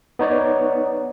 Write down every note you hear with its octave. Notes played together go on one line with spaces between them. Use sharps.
B3 D#4 C#5 D5